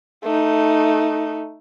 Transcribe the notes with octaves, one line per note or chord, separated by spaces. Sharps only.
A3 D#4